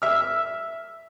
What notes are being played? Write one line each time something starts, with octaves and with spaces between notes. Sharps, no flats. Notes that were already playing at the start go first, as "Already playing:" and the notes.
E5 F6